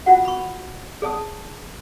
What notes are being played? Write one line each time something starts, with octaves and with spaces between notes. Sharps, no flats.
F4 F#4 F#5
B5 C#6
G#4 D5 A5 D#6